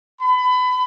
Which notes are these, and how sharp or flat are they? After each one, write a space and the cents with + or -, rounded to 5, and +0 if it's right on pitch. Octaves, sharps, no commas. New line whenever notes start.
B5 +25